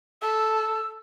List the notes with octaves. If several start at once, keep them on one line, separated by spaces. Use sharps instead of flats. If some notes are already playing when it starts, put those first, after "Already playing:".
A4 E6